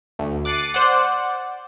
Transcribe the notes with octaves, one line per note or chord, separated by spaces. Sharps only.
D2
D6 F#6 A6 C7 C#7 D#7
C5 D5 F#5